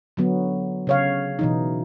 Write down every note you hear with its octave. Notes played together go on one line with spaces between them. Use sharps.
D3 F#3 B3
C#3 C#5 F5
B2 E3 D#4